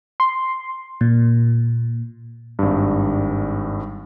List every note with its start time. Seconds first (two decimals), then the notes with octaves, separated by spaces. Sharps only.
0.20 C6
1.01 A#2
2.59 G#1 G2